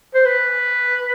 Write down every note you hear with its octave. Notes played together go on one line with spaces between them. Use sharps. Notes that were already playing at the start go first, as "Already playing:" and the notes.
C5
B4